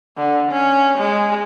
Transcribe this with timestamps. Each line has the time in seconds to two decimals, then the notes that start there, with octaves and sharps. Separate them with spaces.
0.17 D3
0.51 C#4
0.98 G#3